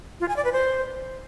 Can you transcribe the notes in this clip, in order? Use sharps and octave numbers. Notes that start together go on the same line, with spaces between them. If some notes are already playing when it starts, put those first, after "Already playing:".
F4
G#5
D5
B4
C5